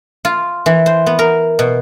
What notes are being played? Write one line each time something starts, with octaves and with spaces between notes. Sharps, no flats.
F4
E3
C5
B3
A#4
B2